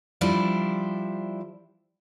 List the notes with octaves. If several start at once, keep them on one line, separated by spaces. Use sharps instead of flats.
F3 G3 D4 E4 C5